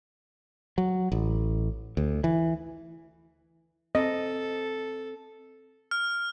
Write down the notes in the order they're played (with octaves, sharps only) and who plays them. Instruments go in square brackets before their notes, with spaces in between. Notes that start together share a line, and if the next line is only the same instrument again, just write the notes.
[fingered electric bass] F#3
A1
D2
E3
[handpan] C4 [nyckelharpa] A4 [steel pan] D#5
[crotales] F6